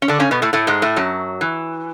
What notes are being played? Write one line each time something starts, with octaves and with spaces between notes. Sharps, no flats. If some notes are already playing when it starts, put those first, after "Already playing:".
C#4
D3 D4
C#3 C#4
B2 B3
A2 A3
A2 A3
G#2 G#3
A2 A3
F#2 F#3
E3